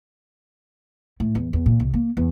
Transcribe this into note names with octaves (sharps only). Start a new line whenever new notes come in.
A2
E2
E2
A#2
C2
A#3
E2